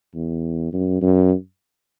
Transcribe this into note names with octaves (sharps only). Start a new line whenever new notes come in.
E2
F#2
F#2